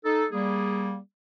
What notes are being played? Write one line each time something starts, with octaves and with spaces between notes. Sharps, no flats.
D#4 A4
G3 A#3 G#4